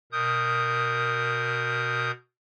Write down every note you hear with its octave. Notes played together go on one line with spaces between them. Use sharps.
B2 A#4 D#6 G6